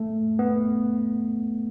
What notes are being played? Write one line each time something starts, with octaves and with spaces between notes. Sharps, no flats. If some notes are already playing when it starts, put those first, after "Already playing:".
Already playing: A3
B3